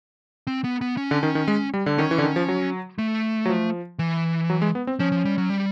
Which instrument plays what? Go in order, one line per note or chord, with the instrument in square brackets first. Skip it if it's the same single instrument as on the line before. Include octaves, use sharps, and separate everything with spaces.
[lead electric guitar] C4
B3
B3
C#4
[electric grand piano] D3
D#3
D#3
G#3
G3
D3
[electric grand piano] D#3 [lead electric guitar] C#4
[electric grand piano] E3
D3
D#3
F3
F#3
[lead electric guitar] A3
[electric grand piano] F#3
F3
[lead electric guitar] E3
[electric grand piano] F#3
G#3
B3
C4
[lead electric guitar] F3 [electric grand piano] C#4
[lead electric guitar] F3
G3
F#3
G3